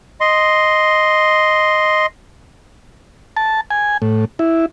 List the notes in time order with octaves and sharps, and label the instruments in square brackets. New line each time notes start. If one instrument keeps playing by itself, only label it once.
[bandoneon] D#5 C6
[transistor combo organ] A5
G#5
A2
E4